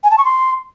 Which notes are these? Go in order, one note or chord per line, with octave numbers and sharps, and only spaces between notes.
G#5
A5
C#6
C6